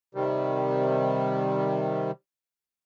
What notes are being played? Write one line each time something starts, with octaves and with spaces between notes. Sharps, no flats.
C3 D#3 G3